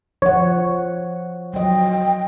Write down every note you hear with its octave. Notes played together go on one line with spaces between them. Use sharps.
F3 C#5 F#5
F#3 D#5 G5